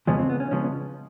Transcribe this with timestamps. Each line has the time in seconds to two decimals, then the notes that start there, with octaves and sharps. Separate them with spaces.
0.07 F2 C#3 F3 G#3 B3 C#4
0.19 C4
0.29 B3
0.40 C#4
0.51 C#3 F3 G#3 B3 C#4